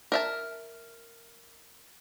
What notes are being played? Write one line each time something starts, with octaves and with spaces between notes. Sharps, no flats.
A#4 E5 A5